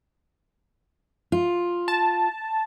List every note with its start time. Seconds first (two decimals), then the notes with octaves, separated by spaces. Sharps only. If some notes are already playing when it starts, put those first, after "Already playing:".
1.32 F4
1.88 A5